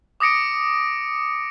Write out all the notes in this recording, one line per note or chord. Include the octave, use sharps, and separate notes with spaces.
D6 D#6 A#6 C#7 D7